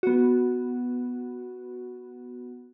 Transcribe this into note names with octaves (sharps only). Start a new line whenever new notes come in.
B3 F#4